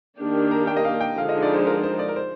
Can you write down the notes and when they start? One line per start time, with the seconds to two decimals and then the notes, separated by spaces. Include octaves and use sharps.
0.19 D#3 A#3 D4 G4
0.51 A#5
0.67 G5
0.77 D#5
0.84 F5
1.01 G5
1.17 D3 F3 G#3 D#4 F5
1.29 D#5
1.42 D5
1.54 C5
1.67 A#4
1.83 C5
1.99 D5
2.08 A#4
2.16 C5